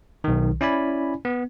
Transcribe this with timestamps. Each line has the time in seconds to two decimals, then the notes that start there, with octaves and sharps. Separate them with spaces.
0.24 B1 D#3
0.61 C#4 E4 D5 G#5 B5
1.25 B3